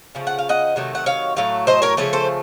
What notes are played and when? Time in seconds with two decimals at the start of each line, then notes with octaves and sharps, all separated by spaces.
0.15 C#3 F3 A3
0.27 F#5
0.39 F5
0.49 D#5 F#5
0.76 C3 D#3 F#3 A3
0.95 F#5
1.06 C#5 F5
1.36 A2 F#3 A3 F5
1.67 C5 D#5
1.82 A#4 C#5
1.97 C#3 F3 A3 C#5
2.13 A4 C5